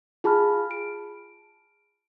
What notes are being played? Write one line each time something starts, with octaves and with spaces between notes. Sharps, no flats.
F4 G#4 A5 B5 F6
D7